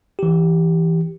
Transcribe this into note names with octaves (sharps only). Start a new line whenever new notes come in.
E3 G4